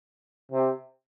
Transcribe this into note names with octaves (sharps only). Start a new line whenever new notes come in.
C3